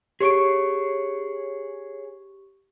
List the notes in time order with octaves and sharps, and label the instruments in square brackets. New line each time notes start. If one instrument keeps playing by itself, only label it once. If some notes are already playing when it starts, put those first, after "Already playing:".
[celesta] G4 C#6 D7 [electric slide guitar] G#4 C#5